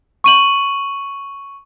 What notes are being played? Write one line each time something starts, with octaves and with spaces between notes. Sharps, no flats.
C#6 D#7 F#7